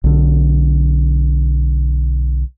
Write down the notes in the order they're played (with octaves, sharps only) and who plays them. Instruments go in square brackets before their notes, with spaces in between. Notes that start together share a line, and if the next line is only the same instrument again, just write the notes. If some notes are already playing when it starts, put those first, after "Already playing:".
[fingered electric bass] B1 D3